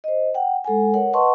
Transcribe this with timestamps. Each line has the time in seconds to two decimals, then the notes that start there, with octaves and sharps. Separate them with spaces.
0.04 C5 D#5
0.34 F#5 G5
0.65 G#3 A4 F#5 G#5
0.94 A#4 C#5 F#5
1.13 B4 D#5 F#5 A5 C6 C#6